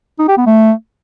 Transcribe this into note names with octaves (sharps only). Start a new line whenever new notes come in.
D#4
G4
B3
A3